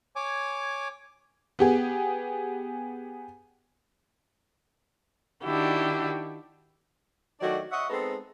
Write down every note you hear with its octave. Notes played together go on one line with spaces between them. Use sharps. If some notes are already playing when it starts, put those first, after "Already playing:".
C#5 G#5 D6
B3 G4 G#4
D#3 D4 E4 F#4 G4
D#3 F#3 A3 D4 F#4 D5
C#5 D#5 E5 F#5
G#3 B3 C4 D#4 A4